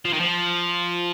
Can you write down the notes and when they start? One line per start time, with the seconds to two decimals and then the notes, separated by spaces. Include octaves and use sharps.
0.05 F3
0.13 D#3
0.20 F3